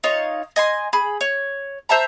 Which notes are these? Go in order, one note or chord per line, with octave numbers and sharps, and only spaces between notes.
D#4 F4 C#5
D#5 G#5 C6
G#4 B5
C#5
C5 E5 A5 A#5